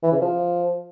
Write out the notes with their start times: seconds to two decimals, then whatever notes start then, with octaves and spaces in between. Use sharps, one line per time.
0.03 E3
0.12 C#3
0.21 F3